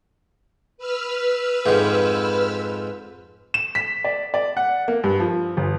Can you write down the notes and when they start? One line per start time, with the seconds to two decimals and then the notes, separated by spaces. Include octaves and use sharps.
0.78 B4 E6 F6
1.66 F2 G#2
3.54 E7
3.75 B6
4.04 D5
4.34 D5
4.57 F#5
4.88 A#3
5.04 G2
5.20 F3
5.57 G1